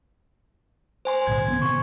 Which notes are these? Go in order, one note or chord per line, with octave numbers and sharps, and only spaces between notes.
C5 G#5 C6
B1 A2 C#3 G#6
D#3 A3 B3
C3 C#6